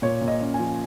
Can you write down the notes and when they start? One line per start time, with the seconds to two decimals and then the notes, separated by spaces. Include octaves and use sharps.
0.02 A#2 C#5
0.21 A#2
0.28 D#5
0.41 C#4
0.54 G#5
0.60 F3